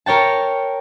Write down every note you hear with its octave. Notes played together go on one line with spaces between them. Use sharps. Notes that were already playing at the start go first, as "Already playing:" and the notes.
A#4 C#5 G5 A5